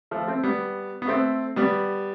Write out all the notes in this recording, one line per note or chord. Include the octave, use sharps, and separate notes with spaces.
F3 A3
A3 C4
G3 B3
B3
A3 C4
G3 B3